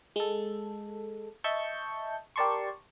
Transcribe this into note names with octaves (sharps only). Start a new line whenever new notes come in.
G#3 A4
D#5 E5 A5 C#6 G6
G4 A#4 D5 A5 C6 C#6